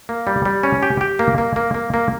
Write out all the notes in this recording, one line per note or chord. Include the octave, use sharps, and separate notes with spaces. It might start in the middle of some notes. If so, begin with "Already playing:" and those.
A#3
G3
G3
C#4
G4
G4
A#3
A#3
A#3
A#3
A#3